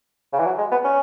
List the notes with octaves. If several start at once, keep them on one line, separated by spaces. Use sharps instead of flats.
C#3
E3
F#3
G#3
B3
C#4